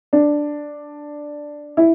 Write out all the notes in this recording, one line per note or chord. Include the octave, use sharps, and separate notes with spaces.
D4
E4